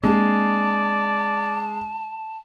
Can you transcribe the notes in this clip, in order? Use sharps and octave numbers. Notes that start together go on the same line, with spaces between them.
G#3 A#3 C4 D4 G#4 D5 A5